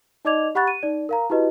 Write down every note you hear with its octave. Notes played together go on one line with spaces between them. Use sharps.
D#4 D5 D#5 D6 G#6 F7
G4 F#5 B5 C#6 F#6 A6
D#7
D#4 D5
A#4 F5 A#5
E4 F#4 G4 B4 D#5